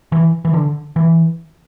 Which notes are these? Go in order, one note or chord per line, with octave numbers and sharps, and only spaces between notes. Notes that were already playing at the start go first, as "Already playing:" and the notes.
E3
E3
D3
E3